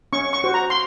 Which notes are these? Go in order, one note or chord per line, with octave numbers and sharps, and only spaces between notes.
C#4 C#6
C#6
F#4 C5
A#5
C6